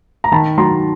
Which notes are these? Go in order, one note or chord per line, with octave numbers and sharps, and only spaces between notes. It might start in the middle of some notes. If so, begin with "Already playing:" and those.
A#5
D#3 A5 B5
F#3 A#5 C6